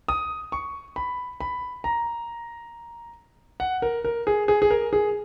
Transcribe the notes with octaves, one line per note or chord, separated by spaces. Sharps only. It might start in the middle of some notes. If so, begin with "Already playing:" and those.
D#6
C#6
B5
B5
A#5
F#5
A#4
A#4
G#4
G#4
G#4
A#4
G#4